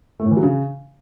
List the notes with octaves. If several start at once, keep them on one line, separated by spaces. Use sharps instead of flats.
A3
A2
E3
F#3
C#3